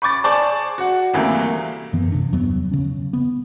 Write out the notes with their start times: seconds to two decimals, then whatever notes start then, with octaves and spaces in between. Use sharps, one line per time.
0.02 B5 C#6 D6 A6
0.24 G#4 C5 D5 A5 C#6 D6
0.78 F#4 F#5
1.14 C2 C3 E3 A3 A#3
1.93 F#2 E3 B3
2.12 G2 C3 D4
2.32 E2 F#3 B3
2.71 C#3 C#4
3.13 B3